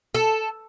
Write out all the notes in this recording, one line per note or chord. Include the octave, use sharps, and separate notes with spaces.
A4